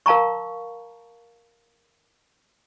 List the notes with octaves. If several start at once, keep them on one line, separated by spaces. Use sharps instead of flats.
A#4 F5 A5 A#5 C#6